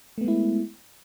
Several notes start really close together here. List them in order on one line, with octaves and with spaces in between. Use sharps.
A3 B3 G#3 E4